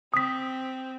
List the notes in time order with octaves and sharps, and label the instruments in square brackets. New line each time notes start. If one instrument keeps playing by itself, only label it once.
[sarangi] C4 [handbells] D#6 B6